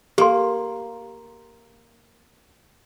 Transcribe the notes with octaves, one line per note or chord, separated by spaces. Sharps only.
A#3 G4 C6